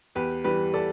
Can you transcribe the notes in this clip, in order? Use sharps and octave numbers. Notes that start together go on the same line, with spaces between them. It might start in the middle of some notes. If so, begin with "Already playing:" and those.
E2 G4 B4
E3 G3 G4 B4
A4 D5